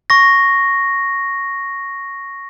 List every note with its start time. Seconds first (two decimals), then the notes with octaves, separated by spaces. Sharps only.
0.10 C#6 A#6